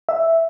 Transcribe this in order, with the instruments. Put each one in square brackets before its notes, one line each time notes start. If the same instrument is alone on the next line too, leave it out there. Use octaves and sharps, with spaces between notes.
[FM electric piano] E5